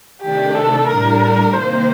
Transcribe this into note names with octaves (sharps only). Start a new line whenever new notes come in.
C3 D#3 A3 D4 G4
A4
A2 G3 D4 A#4
C3 D#3 A#3 C5